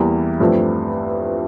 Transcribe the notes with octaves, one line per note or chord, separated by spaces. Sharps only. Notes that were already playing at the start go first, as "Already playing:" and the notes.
Already playing: E2 E3 G3 A#3 E4
G2 F3 A3 C4